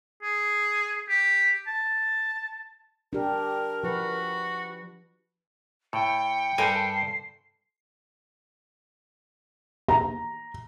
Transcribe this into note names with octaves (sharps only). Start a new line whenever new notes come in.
G#4
G4
A5
D4 G4 A#4
F3 F#4 B4
A2 G5 C#7
G2 A4 A#4 C5 G#5 C7
A#5